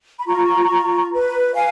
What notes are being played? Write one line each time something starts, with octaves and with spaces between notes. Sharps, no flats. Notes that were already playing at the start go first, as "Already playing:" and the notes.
B5
F4 A#5 C#6
F4
B4
F5 G#5